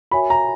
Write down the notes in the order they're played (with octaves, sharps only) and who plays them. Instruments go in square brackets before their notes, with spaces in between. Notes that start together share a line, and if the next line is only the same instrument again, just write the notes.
[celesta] F#4 A#4 C#5 E5 G#5 [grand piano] B5
[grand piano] A#5